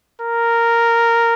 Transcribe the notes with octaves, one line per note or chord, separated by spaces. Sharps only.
A#4